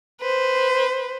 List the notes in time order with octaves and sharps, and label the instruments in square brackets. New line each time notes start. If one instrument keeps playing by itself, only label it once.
[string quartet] B4 C5